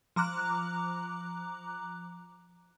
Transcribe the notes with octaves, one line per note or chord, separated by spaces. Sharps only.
F3 A#5 D6 F#6